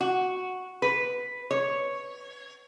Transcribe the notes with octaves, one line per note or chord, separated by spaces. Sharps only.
F#4
B4
C#5